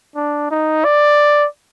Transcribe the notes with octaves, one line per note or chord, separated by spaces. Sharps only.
D4
D#4
D5